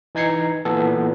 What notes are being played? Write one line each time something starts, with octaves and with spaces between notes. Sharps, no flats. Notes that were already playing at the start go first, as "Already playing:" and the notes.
E3 D#4 G#6 C7 C#7
A#2 E3 B3 A4